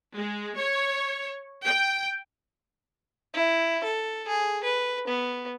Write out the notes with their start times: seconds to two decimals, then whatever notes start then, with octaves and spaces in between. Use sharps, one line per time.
0.15 G#3
0.57 C#5
1.64 G5
3.34 E4
3.84 A4
4.28 G#4
4.64 B4
5.08 B3